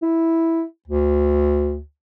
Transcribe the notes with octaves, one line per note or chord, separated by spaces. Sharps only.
E4
D2